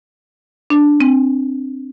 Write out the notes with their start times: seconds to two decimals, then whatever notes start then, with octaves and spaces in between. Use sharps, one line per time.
0.70 D4
1.00 C4